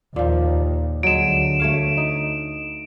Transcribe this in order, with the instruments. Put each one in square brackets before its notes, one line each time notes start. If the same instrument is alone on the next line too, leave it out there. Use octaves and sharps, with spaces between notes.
[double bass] D#2 [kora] A#2 F3
[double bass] D2 [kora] F#3 G#3 [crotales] D7 E7
[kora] A3 C#5 F5
D#4